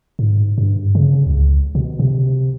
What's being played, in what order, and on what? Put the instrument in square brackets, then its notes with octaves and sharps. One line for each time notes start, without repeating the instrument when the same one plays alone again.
[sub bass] G#2
G2
C#3
C#2
B2
C3